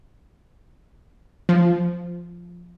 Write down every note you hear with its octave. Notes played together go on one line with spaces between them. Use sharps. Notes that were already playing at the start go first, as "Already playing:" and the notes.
F3